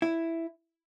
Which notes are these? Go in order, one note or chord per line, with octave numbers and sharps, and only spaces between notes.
E4